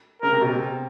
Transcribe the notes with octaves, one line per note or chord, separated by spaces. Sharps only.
C#3 A#4
C3
B2
C3